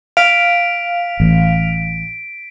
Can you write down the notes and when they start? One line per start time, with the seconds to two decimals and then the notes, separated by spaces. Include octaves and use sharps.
0.17 F5 B6 D7
1.20 A1